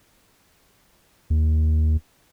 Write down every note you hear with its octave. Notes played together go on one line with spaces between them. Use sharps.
D#2